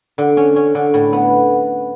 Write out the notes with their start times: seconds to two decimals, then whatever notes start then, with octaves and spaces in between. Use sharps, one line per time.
0.18 D3
0.37 C#4
0.56 C#4
0.75 D3
0.94 A2
1.13 B3